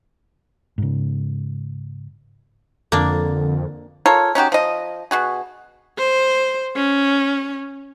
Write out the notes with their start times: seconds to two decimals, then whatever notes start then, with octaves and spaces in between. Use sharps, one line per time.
0.78 G#2 C#3
2.92 F2 D3 A#3 D4
4.06 F4 A4 A#4 C#5
4.35 C#4 D#4 F#4 G4
4.52 F3 D#5
5.11 B2 F#4 G#4
5.98 C5
6.76 C#4